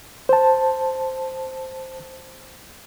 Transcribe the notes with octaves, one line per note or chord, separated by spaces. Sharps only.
C5 A5